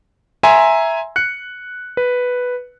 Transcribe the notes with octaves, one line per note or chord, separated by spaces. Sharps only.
E5 G#5 A#5 C6
F#6 C#7
B4